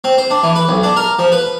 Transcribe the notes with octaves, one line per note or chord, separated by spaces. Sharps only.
C4
C5
D4
E3
B4
B1
D4
A#4
F3
B4